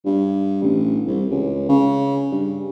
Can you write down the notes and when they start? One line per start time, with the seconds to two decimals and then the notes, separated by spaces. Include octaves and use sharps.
0.05 G2
0.62 A1
1.07 C2
1.30 C#2
1.69 C#3
2.32 G2